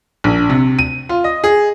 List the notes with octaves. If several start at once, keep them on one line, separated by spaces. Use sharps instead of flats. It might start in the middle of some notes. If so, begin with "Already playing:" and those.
A#1
C3
D#7
F4
D#5
G#4